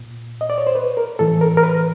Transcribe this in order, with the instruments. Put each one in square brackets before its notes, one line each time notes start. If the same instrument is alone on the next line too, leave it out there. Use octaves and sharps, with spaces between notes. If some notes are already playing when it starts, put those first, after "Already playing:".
Already playing: [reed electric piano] A#2
D#5
D5
C#5
C5
B4
A#4
A2 E3 A4
A#4
A#4
B4